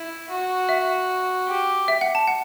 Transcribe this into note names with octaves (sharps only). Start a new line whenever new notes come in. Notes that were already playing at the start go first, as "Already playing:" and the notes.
Already playing: E4
F#4
E5
G4
E5
F#5
A5
F#5